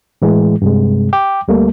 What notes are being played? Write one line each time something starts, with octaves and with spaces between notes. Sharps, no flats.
A2 E3 G#3
G2 C3 G#3
G5 D6
D2 G3 A3 A#3